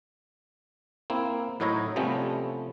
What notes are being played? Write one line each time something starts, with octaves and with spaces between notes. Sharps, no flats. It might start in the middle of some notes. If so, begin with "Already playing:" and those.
A#3 C4 E4
A2 F#3 D#4 E4 C#5 A#5
C3 F3 G3 A3 B3 C#4